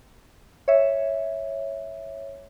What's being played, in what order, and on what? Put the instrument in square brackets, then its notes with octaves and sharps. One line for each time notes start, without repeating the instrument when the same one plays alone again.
[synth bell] C#5 E5